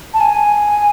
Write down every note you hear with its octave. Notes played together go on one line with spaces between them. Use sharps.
A5
G#5